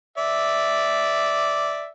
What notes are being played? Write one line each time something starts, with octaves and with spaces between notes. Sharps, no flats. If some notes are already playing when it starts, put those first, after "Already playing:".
D5 E5